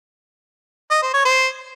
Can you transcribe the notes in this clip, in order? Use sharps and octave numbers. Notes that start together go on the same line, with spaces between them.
D#5
C5
C#5
C5